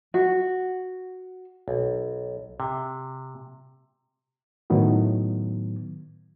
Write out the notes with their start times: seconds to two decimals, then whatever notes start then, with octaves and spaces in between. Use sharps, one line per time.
0.14 F#4
1.68 B1
2.60 C3
4.70 A2 D#3 F#3 B3